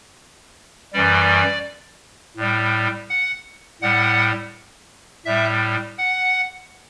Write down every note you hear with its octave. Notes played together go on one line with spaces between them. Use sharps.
F#2 E3 G3 D5
A2 G3
F#5
A2 G3 F#5
A2 G3 E5
F#5